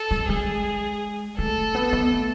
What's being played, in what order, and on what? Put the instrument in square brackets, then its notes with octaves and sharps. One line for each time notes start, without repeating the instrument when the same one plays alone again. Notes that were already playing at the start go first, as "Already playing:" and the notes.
Already playing: [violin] A4
[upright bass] G#3
[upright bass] G#3 [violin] G#4
[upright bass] A3 [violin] A4
[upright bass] B3
B3
A3